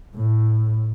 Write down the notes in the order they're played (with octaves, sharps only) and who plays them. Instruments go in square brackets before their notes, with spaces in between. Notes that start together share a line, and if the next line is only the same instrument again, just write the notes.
[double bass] A2